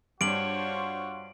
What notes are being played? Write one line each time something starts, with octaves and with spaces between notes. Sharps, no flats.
G2 D4 F4 F#4 C5 C#5 D7 F#7